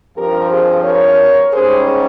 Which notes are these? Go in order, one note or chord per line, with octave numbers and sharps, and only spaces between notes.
G2 F3 C4 G4 A#4
G#4 C5
A#4 C#5
G#2 G3 C#4 G#4 C5